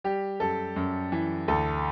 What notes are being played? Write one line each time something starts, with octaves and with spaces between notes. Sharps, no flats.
G3 G4
F#2 A4
F#2
E3
D2 A4